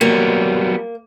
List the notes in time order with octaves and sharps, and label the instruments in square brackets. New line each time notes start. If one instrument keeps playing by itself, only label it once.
[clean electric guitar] F#3 G3 B3 [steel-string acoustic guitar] A#3